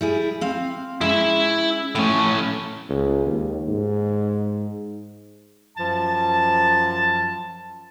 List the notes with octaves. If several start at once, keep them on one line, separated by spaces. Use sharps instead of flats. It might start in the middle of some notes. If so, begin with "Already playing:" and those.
G3 E4 G#4
C4 F5
G#3 C#4 E4 E5
A2 F3 A3 C#4
C#2
D#2
G#2
F#2 F3 A5